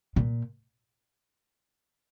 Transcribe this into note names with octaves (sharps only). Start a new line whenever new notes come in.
A#2